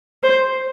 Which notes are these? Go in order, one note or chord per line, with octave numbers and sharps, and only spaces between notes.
C5